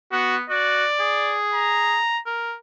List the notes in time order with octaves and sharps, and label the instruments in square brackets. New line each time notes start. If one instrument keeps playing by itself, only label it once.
[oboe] B3 [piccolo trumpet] F#4
[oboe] F#4 [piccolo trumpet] D5
[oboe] G#4
[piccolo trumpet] A#5
[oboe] A#4